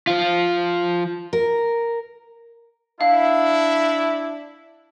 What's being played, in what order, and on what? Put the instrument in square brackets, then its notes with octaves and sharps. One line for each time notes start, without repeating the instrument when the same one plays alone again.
[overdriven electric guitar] F3 F4
[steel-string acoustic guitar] A#4
[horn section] D4 E4 [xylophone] F5